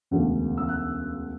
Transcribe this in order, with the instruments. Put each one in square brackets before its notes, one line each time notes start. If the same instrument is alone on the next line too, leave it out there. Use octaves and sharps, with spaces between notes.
[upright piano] E1 D2 C#3
E6
F#6